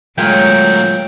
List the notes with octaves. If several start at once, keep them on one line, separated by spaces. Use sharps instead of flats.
A#2 F#3 G#3 A3 C#5 G5